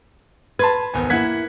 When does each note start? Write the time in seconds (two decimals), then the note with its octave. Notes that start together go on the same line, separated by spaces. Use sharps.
0.59 B4 A5 C6 G#6
0.94 G#1 E2 G#5
1.10 A#3 E4 F#5 G#6 B6